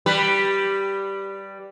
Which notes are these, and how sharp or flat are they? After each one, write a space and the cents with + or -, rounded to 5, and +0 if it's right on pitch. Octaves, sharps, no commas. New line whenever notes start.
G3 -5 B4 +0